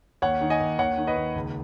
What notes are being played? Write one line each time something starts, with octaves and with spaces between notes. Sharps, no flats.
D#2 C#5 F#5
D#3
D#5 G#5
D#2
D#2 C#5 F#5
D#3
B4 D#5
D#2
C#2